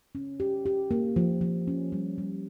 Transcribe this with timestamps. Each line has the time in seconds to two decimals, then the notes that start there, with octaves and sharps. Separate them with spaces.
0.15 C#4
0.40 G4
0.66 G4
0.91 A#3
1.16 F3
1.41 F3
1.68 C#4
1.92 G3
2.18 G3